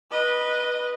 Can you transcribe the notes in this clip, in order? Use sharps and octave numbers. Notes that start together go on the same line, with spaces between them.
B4 D#5